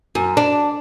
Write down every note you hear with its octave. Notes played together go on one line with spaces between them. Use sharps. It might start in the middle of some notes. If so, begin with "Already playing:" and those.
F#2
D4